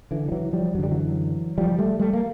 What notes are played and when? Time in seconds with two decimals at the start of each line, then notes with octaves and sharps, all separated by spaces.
0.11 D3 E3
0.28 G3
0.32 E3 F#3
0.53 F3 G3
0.75 F#2 F#3
0.79 D3 G3
0.91 E3 F#3
1.58 F3 G3
1.79 G3 A3
1.99 G3 A3
2.13 A#3